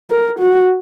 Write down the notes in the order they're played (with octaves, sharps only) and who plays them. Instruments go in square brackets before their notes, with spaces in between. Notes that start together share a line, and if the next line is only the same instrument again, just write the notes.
[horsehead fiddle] A#4
F#4